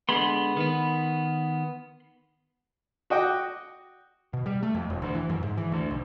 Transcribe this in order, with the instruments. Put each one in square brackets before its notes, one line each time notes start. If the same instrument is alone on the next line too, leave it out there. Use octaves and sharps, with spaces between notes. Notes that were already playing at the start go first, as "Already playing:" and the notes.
[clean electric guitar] D3 G#3 B3 [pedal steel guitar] B5 C6
[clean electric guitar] D#3 B3
[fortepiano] F#4 D#5 G5 D6
[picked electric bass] B2
G3
A3
F2
E1
D2
E3
F#2
G#2
E3
D2
B1